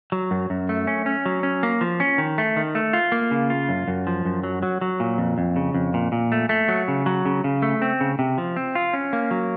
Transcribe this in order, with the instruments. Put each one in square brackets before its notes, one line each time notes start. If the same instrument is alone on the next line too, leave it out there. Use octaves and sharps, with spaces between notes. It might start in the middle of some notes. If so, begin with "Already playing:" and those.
[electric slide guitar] F#3
F#2
F#2
A3
C#4
C#4
F#3
C#4
A#3
F3
C#4
D#3
A3
D#3
A3
F4
A#3
C#3
F4
F#2
F#2
F3
F#2
F#3
F#3
F#3
A#2
F2
F2
C#3
F2
A#2
A#2
A3
A3
F#3
C#3
F#3
C#3
C#3
A3
C4
C#3
C3
F3
C4
F4
C#4
A#3
F#3